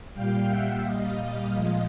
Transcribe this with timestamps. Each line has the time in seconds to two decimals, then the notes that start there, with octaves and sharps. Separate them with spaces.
0.13 A#2 G3 F5 G5
0.48 E5 F#5
0.83 A#2 G3 D#5 F5
1.54 A#2 F3 G#3